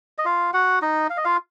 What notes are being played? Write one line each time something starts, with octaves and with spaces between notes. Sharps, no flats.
D#5
F4 F5
F#4 F#5
D#4 D#5
F5
D#5
F4 F5